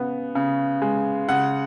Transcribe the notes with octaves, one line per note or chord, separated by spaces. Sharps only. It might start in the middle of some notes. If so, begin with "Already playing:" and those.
Already playing: C#3 B3
C#3
G#3
C#3 F#5